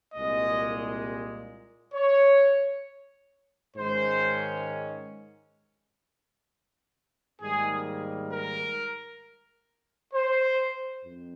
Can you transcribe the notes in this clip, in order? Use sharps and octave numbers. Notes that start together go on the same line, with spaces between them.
C2 A#2 G#3 D#5
C#5
G#2 D#3 G#3 C#4 C5
G#2 D#3 G3 A#3 G#4
A#4
C5
F2